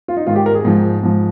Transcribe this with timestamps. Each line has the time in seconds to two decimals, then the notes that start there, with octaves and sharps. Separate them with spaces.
0.08 F4
0.17 D#4
0.27 G#2 D#3 F4
0.36 G4
0.46 A#4
0.55 G#4
0.65 G#2 F3
1.03 G#2 F3